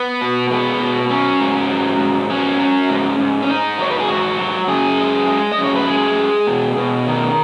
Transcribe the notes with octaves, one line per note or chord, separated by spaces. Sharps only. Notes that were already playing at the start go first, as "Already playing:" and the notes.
Already playing: B3
B2
G#3 B3
B2
F#3 C#4
G#2
F#3
G#2
F#3 C#4
F#3
G#2
G#2
C#4
G#2 D#4
F#3 C#5
B4
G#4
G#2 F#4
F#3
F#2 G#4
G#3
G#3
D#5
F#2
C#5
B4
G#3 G#4
G#3
B2
B2
D#3